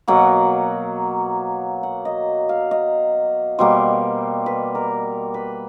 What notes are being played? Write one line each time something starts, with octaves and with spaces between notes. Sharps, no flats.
B2 F#3 A#3 F#5
F#5
D#5
F5
D#5
B2 G3 A#3 C5
B4
A#4
B4